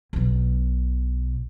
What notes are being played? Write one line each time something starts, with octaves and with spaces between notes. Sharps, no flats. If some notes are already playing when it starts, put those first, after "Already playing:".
B1 B2